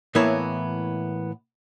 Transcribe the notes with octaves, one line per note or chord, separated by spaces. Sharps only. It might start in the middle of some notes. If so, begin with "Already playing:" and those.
A2 E3 A#3 B3 E4 C#5